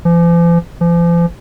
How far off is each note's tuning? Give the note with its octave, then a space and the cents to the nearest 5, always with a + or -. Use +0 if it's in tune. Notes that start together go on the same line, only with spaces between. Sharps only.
F3 -45
F3 -40